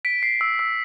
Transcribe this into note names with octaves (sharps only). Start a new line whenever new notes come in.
B6 D7
C7
E6
E6